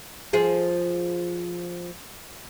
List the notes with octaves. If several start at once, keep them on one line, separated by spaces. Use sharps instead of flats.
F3 G#4